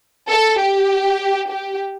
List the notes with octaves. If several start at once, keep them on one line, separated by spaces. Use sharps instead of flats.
A4
G4
G4